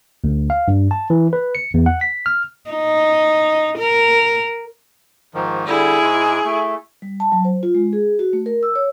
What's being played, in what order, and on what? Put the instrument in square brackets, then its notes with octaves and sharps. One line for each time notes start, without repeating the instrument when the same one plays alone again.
[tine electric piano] D2
F5
G2
A5
E3
B4
C#7
E2
F#5
B6
F6
[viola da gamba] D#4
A#4
[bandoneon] G#2 D#3 F3
[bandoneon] D3 G3 [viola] E4 G#4
[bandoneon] G#2 G#3
A3
[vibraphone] G3
A5
F#3
C5
F4
G#3
G#4
F#4
A3
A#4
E6
C#5